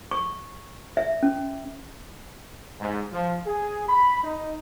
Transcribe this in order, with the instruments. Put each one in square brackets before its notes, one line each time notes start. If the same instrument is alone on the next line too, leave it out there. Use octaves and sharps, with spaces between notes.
[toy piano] C#6
E5
C#4
[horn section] G#2
F3
G#4
B5
D#4